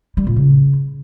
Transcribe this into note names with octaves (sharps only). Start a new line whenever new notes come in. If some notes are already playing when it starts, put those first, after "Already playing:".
G3
A#2
C#3